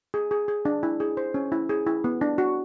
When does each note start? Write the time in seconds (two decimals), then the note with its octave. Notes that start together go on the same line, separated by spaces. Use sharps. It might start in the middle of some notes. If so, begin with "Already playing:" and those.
0.14 G#4
0.31 G#4
0.48 G#4
0.65 D4
0.83 E4
1.00 G#4
1.17 C5
1.34 C#4
1.52 E4
1.69 G#4
1.87 E4
2.04 B3
2.21 D4
2.38 F#4